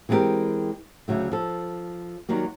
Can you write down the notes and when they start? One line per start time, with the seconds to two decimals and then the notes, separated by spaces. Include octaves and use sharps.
0.09 E3 G#3 C4 D4 G4 A#4
1.08 D2 C#3 F#3 A3
1.32 F3 A4
2.29 D#3 F#3 G3 A#3